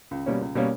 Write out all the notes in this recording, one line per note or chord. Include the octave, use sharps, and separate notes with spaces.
C#2
B2 G3 A#3 C#4
C#2
B2 G3 A#3 C#4